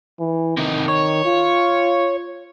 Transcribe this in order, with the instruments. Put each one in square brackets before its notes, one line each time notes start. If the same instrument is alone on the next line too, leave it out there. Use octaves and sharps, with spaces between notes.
[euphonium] E3
[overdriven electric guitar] C3 D#4 [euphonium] D#3
[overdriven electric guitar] C#5
[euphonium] F4